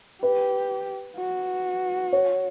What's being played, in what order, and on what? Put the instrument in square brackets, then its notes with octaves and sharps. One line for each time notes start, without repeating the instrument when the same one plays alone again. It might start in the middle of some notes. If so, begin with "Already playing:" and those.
[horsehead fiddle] G4 [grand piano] B4
[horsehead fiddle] F#4
[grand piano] C#5